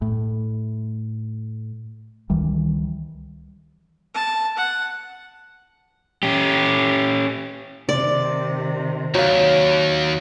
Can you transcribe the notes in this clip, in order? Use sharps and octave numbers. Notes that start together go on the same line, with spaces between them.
A2
C#2 D#3 E3 G3
A5
F#5
C#4 G4
C3 D#3 D5
D#2 F#3 F5